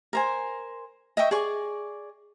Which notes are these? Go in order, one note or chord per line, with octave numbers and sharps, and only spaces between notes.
A#4 C5 G#5
D#5 E5 G5 C#6
G#4 D5 C#6